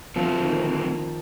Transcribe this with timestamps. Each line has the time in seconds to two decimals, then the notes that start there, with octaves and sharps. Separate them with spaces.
0.16 D3 F3 A3 C4
0.45 D#3